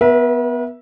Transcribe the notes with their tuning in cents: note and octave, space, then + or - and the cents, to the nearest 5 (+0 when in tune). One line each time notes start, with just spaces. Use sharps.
B3 +0 B4 -45 E5 +0